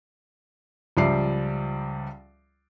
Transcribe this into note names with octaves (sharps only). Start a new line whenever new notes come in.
C#2 F3 G3 D5 E5 C7